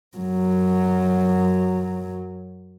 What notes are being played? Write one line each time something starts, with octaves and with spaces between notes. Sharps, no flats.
F#2 F#3